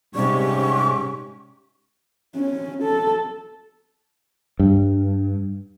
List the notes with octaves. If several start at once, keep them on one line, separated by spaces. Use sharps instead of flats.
G#2 C3 G3 C#4 G4 C#6
C#4
A4
G2